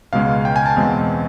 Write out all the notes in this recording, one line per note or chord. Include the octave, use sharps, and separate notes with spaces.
C#2 B2 G#3 C#4 F5
G5
G#5
A5
E2 B2 G#3 C4